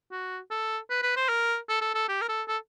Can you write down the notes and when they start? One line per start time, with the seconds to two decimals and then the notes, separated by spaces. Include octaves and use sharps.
0.11 F#4
0.50 A4
0.90 B4
1.02 B4
1.16 C5
1.29 A#4
1.69 A4
1.81 A4
1.94 A4
2.08 G4
2.21 A#4
2.28 A4
2.48 A4